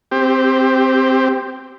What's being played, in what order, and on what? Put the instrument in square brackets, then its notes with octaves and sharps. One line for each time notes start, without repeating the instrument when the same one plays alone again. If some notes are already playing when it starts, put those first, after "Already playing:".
[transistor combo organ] C4 G4